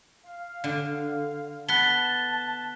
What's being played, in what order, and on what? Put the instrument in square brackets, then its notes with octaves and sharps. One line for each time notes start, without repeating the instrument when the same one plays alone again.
[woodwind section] F5
[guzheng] D3
[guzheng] B3 [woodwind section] A5 [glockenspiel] F#6 B6 G7